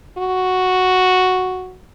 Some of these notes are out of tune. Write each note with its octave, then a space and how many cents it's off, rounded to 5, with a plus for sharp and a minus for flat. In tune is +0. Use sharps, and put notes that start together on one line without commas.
F#4 +0